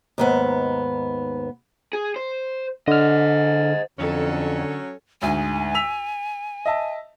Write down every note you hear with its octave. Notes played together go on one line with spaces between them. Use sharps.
D#2 G#2 B3
G#4
C5
D3 C5 D#5 F6
F2 D3 F#3 C#4 A4
D2 G#2 G#5
E6 B6 F7
D#5 E5 A5